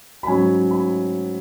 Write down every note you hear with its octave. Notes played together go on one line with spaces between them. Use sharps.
B5
G#2 F#3 C#4 G#5
B5